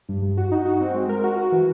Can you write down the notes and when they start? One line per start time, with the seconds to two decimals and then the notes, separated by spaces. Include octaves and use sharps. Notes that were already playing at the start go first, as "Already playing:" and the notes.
0.09 G2
0.22 G2
0.37 F#4
0.52 D#4
0.65 F#4
0.81 C4
0.94 G#3
1.09 A#4
1.24 F#4
1.38 F#4
1.52 E3